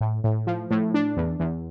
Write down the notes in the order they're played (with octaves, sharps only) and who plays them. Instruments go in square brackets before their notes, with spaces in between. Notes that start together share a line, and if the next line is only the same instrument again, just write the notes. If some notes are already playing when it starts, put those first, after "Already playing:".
[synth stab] A2
A2
F3
A2
D4
E2
E2